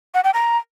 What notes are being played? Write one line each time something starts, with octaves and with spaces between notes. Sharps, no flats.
F#5
G5
A#5